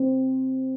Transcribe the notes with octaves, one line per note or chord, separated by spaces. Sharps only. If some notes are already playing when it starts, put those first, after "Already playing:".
Already playing: C4